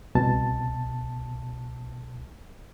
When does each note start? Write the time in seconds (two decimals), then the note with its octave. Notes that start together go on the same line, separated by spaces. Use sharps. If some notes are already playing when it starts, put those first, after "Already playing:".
0.15 C2 B2 A5